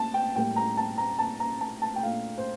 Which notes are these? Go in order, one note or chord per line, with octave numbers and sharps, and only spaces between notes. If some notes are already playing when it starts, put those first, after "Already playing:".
Already playing: A5
G5
A2 G3 A#3 G5
A#5
A5
A#5
A5
A#5
A5
A5
G5
A#2 A3 D4 F5
C5